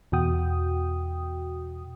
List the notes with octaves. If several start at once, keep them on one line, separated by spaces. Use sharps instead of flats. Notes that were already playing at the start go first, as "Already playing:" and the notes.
E2 B2 F#4 G5 D#6